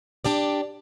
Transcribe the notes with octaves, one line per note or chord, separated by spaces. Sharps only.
D4 G4 D5